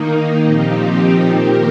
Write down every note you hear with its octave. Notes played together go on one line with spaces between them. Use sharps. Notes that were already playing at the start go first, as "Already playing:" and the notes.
Already playing: D#3 A#3 D#4
A#2 F3 C4 D#4 G4
D#3 A#3 G4 A#4